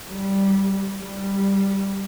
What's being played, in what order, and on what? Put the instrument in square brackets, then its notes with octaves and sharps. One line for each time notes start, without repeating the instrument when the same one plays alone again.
[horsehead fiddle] G3
G3